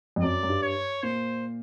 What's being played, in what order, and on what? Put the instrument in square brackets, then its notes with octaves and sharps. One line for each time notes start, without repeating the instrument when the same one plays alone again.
[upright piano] F2
[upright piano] F#2 [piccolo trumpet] D5
[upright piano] F#2
G2
[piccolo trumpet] C#5
[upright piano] A#2 [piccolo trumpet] C5